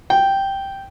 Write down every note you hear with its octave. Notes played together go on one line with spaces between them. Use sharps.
G5